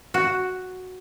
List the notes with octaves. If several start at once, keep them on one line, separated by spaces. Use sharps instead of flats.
F#4